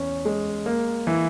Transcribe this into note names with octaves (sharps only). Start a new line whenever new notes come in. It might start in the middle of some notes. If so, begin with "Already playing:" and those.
Already playing: E2 C#4
G#3
A#3
E3